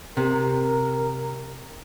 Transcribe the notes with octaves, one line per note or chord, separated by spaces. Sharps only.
C3 A#4